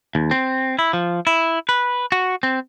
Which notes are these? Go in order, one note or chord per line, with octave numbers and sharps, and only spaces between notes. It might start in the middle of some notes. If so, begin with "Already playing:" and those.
D#2
C4
E4
F3
E4
B4
F#4
C4